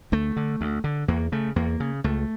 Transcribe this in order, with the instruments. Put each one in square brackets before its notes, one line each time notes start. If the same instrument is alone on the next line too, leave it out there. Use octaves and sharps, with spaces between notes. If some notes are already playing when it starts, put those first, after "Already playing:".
[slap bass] D2 A3
D3
D2
D3
E2 A#3
C#3 A3
E2 A#3
C#3
C#2 A3